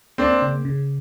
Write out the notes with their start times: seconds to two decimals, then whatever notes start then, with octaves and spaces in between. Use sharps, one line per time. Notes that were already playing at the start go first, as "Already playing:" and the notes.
0.18 A#3 C4 D4
0.42 C#3
0.65 C#3